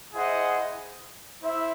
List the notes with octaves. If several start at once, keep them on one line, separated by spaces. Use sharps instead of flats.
E4 G#4 C5 D#5 F#5
E4 C5 E5